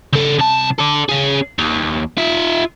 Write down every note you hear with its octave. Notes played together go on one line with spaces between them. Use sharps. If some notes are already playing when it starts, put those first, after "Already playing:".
C#3 A4
C2 A5
A4 D5
C#4 G#4
D#2
F4 E5